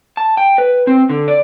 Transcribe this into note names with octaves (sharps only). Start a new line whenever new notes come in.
A5
G5
B4
C4
D3
D5